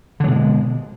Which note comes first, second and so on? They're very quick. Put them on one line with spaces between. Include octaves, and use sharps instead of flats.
D3 F#3 B2 G#3